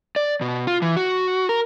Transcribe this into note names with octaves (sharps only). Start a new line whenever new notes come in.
D5
B2
F4
E3
F#4
A#4